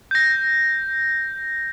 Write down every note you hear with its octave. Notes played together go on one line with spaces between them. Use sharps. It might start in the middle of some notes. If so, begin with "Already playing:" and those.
G6 A#6